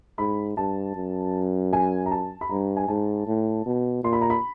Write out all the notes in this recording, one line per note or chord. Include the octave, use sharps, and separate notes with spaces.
G#2 B5
G2 A5
F#2
G#5
A#5
A5
B5
G2 A#5
G#5
G#2 A5
A2
B2
A#2 C6
B5
A#5
B5